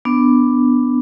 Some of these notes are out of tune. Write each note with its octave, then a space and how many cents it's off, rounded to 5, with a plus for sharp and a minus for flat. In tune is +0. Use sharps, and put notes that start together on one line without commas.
B3 +5 D4 +0